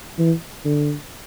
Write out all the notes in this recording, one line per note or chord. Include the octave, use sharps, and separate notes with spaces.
E3
D3